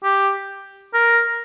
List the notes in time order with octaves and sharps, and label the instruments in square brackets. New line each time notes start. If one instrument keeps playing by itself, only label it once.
[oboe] G4
A#4